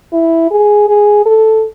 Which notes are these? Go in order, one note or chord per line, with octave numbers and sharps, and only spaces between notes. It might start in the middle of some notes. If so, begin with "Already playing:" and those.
E4
G#4
G#4
A4